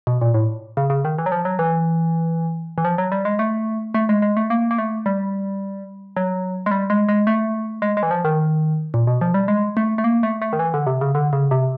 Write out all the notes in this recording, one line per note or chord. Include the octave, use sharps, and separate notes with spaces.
B2
A#2
A2
C#3
C#3
D#3
E3
F#3
F3
F#3
E3
E3
F3
F#3
G3
G#3
A3
A3
G#3
G#3
A3
A#3
A#3
A3
G3
F#3
G#3
G3
G#3
G#3
A3
G#3
G#3
E3
F3
D#3
A#2
B2
F3
G3
G#3
A3
A3
A#3
A3
A3
D#3
E3
D3
C3
C#3
D3
C#3
C3